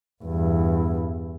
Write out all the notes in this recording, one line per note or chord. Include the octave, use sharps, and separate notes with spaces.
E2 G2